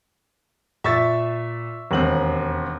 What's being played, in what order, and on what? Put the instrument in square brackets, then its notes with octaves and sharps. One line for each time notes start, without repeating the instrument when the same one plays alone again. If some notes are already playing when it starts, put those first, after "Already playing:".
[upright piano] A#2 [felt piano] E5 C#6 A6
[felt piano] E1 C4 [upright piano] D#2 F#7